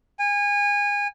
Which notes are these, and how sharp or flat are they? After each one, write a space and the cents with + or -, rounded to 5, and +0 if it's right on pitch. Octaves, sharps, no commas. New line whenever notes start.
G#5 -25